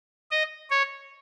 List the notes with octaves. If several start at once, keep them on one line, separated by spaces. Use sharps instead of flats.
D#5
C#5